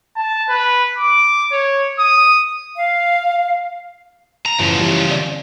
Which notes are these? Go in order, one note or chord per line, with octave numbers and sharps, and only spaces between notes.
A5
B4
D6
C#5
D#6
F5
A#5
A1 C#3 F3
E3 G3
D5